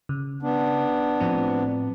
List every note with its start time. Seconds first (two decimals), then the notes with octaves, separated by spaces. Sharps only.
0.09 C#3
0.43 B3 D4
1.20 A2 F3 C4